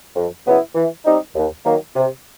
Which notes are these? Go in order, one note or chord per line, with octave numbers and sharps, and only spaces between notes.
F2
C#3 F#3 B3 E4
E3
G3 C4 D#4
D#2
D#3 F#3 A#3
C3